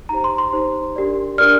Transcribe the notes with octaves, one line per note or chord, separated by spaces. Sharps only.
D#4 G4 C5 A#5
C6
C6
D#4 G4 C5
D4 G4 A#4 D5
D4 G4 A#4 D5 F6